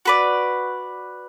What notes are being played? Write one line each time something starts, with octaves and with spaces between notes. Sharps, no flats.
F#4 B4 D5